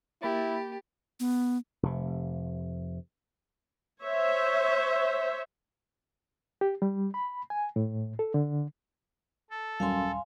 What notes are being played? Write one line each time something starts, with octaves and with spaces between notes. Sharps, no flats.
A#3 E4 G4 B5 A6
B3
F1 C3
C5 C#5 E5
G4
G3
B5
G#5
A2
A4
D3
A4
D#1 F#2 G3 C#4 F5 G#5 C6